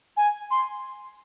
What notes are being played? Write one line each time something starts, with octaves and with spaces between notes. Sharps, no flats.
G#5
C6